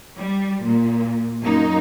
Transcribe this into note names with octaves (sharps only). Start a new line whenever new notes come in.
G3
A#2
F#2 A#3 D#4